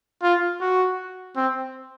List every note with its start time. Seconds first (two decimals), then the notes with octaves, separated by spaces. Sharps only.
0.22 F4
0.61 F#4
1.36 C4